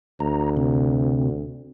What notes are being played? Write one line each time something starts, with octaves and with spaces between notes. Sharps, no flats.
D2 A#5
C3 C4